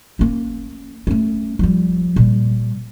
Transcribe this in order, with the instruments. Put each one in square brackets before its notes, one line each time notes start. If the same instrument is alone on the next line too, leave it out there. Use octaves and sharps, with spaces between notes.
[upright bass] A#3 C#4
A3 C#4
F3 G3
A#2 G3